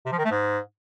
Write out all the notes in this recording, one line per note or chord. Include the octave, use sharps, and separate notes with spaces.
C3
F3
D#3
A3
G#2